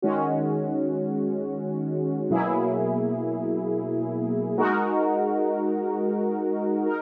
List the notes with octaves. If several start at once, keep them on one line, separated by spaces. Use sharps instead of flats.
D#3 G#3 C#4 F#4
B2 F#3 A#3 E4 G#4
G#3 D#4 F#4 A#4
D#4 A#4